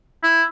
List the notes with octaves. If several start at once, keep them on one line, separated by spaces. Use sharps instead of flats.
E4